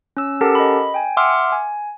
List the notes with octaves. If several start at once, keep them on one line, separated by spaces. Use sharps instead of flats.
C#4 E6
C#4 G4 A4 A#4 F#5 A5
D#5 B5
G5 G#5
E5 F#5 C6 D6 E6 F6
G#5